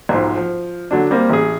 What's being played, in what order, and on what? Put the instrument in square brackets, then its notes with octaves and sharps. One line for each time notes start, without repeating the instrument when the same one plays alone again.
[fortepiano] B1 G#2 F3
F3
D3 F#3 D4
G3 A#3 C4
A1 G#4